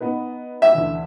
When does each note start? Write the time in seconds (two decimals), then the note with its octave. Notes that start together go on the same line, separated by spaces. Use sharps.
0.01 B3 D#4 B4
0.62 E5
0.75 D2 E3